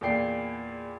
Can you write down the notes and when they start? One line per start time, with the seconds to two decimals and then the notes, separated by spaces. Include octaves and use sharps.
0.01 E2 A#2 D5 G5 C7